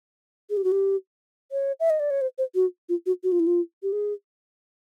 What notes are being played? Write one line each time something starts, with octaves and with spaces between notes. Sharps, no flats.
G#4
G4
F#4
G4
C#5
E5
D#5
D5
C#5
C5
C5
F#4
F4
F#4
F#4
F4
E4
F4
G4
G#4